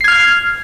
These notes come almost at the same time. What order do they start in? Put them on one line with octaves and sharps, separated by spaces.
C7 G#6 F6